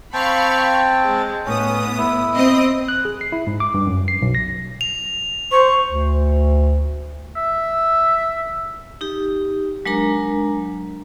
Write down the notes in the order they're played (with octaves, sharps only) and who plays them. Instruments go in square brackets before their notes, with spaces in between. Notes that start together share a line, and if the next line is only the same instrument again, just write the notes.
[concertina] C4 G5 A5 [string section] F5 B5 C#6
[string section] G#3
[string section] A2 B3 D#6 [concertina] C#4
[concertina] E4
[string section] C4 D#5 D#6
[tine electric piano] F#6
G#4
C7
E4
G#2
D6
G2
F#2
C7
B1
A#6
[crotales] F7
[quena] C5 [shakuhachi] C#6
[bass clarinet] D2
[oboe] E5
[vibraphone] D#4 G4
F#3 G#3 D4 A#4 A#5